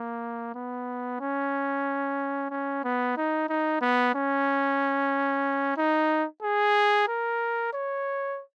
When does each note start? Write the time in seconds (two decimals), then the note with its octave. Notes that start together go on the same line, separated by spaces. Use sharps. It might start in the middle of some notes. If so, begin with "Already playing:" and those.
Already playing: A#3
0.55 B3
1.20 C#4
2.51 C#4
2.84 B3
3.17 D#4
3.49 D#4
3.81 B3
4.15 C#4
5.77 D#4
6.42 G#4
7.08 A#4
7.73 C#5